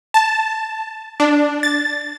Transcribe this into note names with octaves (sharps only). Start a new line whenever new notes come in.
A5
D4
A6